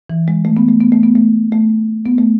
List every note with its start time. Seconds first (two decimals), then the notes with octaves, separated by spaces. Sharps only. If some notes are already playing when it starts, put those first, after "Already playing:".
0.10 E3
0.28 G#3
0.45 A3
0.57 B3
0.69 A3
0.81 B3
0.92 A3
1.03 B3
1.15 A3
1.52 A3
2.06 B3
2.18 A3